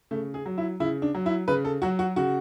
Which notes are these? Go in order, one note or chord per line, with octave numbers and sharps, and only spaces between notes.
C#3 A3
G#4
F#3
E4
C#3 E4
D4
F#3
E4
C#3 B4
A4
F#3 F#4
F#4
C#3 F#4